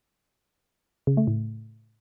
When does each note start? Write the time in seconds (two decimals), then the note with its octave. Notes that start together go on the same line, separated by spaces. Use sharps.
1.07 C#3
1.17 A3
1.27 A2